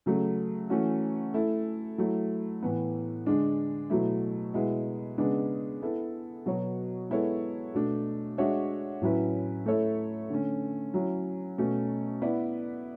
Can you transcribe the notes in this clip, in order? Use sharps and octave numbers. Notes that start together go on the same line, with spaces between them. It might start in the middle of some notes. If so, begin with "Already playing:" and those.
C#3 F#3 A3
E3 A3 C#4 F#4
A3 E4 A4
F#3 A3 E4
A2 E3 B3
D3 G#3 D4
B2 F#3 A3 E4
B2 G#3 B3 E4
C#3 G#3 B3 D4
B3 E4 A4
B2 F#3 B3 F#4 C#5
G#3 B3 E4 A4 C#5
B2 A3 D4
G#3 D4 F#4 C#5 E5
A2 F#3 C#4 E4 B4
A3 E4 A4 C#5 E5
D3 A3 C#4
F#3 C#4 E4
B2 A3 C#4
B3 E4 B4 D5